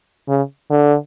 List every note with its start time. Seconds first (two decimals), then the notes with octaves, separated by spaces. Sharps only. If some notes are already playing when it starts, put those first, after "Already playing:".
0.28 C#3
0.70 D3